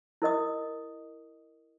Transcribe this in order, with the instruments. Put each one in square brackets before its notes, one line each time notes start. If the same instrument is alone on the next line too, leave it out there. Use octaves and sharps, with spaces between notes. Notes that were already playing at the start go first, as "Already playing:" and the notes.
[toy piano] E4 A#4 D#5 D#6